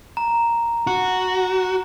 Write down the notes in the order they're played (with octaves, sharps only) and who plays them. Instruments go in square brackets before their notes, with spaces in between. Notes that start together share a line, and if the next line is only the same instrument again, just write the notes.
[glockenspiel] A#5
[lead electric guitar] F#4